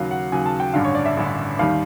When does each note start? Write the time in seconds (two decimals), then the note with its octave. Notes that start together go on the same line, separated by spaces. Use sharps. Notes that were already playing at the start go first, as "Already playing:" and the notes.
Already playing: D#2 C#3 F#3 F5
0.11 F#5
0.32 D#2 C#3 F#3 G#5
0.46 A5
0.60 G5
0.74 A1 G2 D3 F5
0.85 C#5
0.95 D5
1.06 E5
1.17 A1 G2 D3
1.59 D#2 D#3 G3 F5